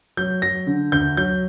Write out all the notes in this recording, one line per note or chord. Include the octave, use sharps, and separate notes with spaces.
F#3 G6
F#3 A#6
D3
D2 G6
F#3 G6